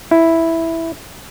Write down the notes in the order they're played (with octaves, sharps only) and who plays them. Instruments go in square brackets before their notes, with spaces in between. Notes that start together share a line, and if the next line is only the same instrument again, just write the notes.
[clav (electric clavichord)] E4